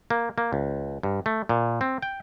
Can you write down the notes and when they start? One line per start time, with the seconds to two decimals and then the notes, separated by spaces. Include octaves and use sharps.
0.10 A#3
0.38 A#3
0.53 C#2
1.03 G2
1.26 A3
1.49 A#2
1.81 C4
2.02 G5